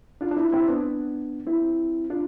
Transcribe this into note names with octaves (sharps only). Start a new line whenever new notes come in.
D4 F4
D4
C4 E4
C4 E4
B3 D4
C4 E4
D4 F4